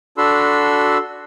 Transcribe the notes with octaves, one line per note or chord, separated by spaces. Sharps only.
D4 F#4 A4 B5 C6 E6